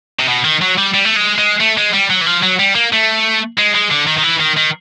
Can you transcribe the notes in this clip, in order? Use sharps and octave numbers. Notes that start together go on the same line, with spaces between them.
C3
B2
D#3
F#3
G3
G3
A3
G#3
G#3
A3
G#3
G3
F#3
E3
F3
F#3
G3
A#3
A3
G#3
G#3
D3
D#3
D#3
E3
D#3
D#3